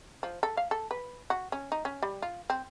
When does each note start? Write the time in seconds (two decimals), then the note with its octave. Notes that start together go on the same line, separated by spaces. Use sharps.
0.23 F3
0.43 A4
0.57 F5
0.71 A4
0.91 B4
1.30 F#4
1.52 C#4
1.72 D#4
1.85 C#4
2.03 G3
2.22 F4
2.50 C4